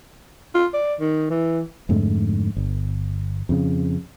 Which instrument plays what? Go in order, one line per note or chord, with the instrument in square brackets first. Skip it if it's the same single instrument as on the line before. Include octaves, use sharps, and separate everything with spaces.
[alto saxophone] F4
D5
D#3
E3
[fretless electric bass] F2 G#2 D3 A3
G1
F2 C#3